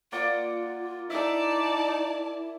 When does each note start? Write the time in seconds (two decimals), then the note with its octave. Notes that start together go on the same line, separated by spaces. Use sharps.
0.12 A#3 F4 D5 F#5
1.10 D#4 E4 D5 E5 A5 D6